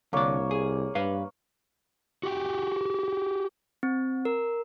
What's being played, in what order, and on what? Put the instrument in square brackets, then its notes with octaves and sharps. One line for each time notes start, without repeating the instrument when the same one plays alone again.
[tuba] C2 [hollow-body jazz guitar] D3 D5 [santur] A#3 C#5
[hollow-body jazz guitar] G#4
[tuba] G2 [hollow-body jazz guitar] B4 F5
[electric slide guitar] F#4 G4 G5
[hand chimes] C4
A#4